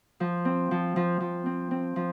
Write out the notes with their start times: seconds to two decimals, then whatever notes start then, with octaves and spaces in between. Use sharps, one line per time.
0.20 F3
0.45 C4
0.71 F3
0.96 F3
1.20 F3
1.46 C4
1.71 C4
1.96 F3